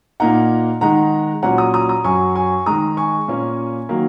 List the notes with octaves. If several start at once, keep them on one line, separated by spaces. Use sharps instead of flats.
A#2 A#3 D#4 F#5 A#5
D#3 G#3 D#4 F#5 A#5
A#2 F#3 C#4 F#5 A#5
A#5 D#6
A#5 D#6
A#5 D#6
F#2 F#3 C#4 G#5 C#6
G#5 C#6
D#3 G#3 D#4 A#5 D#6
G#5 C#6
A#2 A#3 C#4
D#3 F#3 A#3